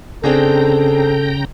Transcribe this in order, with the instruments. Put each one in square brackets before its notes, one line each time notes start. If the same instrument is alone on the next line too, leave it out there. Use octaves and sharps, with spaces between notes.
[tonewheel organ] C#3 G5 A#5 [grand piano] C4 D4 G#4 [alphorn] A4